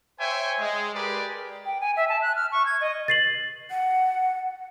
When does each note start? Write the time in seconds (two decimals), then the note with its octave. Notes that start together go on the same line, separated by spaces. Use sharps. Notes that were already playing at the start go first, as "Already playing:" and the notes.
0.19 C5 C#5 E5 G5 G#5
0.60 G#3
0.94 G4 G#4 A#4 B4 D5
1.66 G5
1.81 G#5
1.97 E5
2.09 A5
2.22 F#6
2.36 F6
2.52 C#6
2.66 G#6
2.81 D#5
3.08 A6 C7 F#7
3.70 F#5